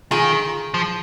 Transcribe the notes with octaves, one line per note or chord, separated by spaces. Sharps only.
D#3 F4 G#4
F3